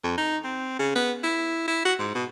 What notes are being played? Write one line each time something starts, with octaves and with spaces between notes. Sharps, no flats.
F2
D#4
C4
C#3
B3
E4
E4
F#4
G#2
B2